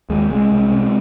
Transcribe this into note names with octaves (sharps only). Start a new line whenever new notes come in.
D#2 G#3
C2 G#3
C2
C3